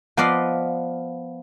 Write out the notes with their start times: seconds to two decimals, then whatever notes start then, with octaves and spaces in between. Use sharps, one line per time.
0.17 F3 B3 B4 D5 D#5 F5